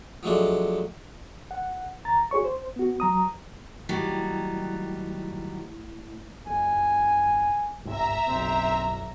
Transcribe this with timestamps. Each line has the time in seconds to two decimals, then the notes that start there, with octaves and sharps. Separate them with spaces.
0.23 F3 F#3 G#3 A3 D4
1.51 F#5
2.05 D2 A#5 A6
2.31 F#4 G#4 C#5 C#6
2.44 C5
2.76 B3 F#4
3.00 F#3 A#5 D#6
3.89 D#3 F#3 G3 A3 E4
6.46 F#1 G#5
7.85 G1 C2 G#2 E5 A#5
8.26 F#1 B1 C4